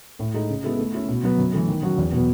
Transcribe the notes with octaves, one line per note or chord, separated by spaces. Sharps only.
A2
G#3 D#4 A4
C#3
G#3 B3 E4 A4
A3
C#4 E4
B2
F#3 B3
F#2
E3 A3
D#3
F#3 C#4 F#4
E2
B2 F#3 B3